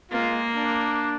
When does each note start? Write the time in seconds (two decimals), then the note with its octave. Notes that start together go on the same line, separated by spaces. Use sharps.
0.11 G#3 A#3 F4
0.54 D4